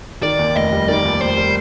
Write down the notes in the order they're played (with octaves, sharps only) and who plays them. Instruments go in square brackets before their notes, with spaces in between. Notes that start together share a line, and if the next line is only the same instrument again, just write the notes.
[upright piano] D#3 [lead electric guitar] D5
[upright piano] D#2
[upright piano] F1 [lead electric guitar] D#5
[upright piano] G3
[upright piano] D#3 [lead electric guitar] D5
[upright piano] D#2
[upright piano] F1 [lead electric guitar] C5
[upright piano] G3